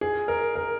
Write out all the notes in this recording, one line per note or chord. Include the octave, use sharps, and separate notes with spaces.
G#4
A#4
A#4